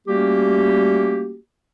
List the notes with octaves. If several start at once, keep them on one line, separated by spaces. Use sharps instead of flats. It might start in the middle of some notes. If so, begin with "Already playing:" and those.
G3 A3 A#3 C#4 F#4 G4